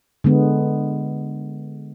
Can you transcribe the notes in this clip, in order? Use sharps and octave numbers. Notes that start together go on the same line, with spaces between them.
D3 G#3 B3